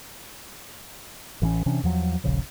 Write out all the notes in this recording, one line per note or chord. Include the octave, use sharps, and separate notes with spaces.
A1 E3 G#3 C#4
C3 E3 C#4 D4
E2 F3 F#3
D#1 A#1 C#3 F3